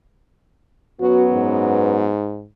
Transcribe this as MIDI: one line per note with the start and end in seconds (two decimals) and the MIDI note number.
1.01 2.10 42
1.01 2.10 54
1.01 2.10 59
1.01 1.24 66
1.33 2.46 44